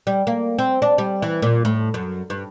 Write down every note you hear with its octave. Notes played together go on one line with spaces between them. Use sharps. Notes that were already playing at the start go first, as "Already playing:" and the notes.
G3
A#3
C4
D4
G3
E3
A#2
A2
F#2
G2